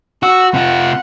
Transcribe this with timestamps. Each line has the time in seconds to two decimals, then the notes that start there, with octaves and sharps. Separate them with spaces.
0.23 F#4 E6
0.54 C3 F4 F#5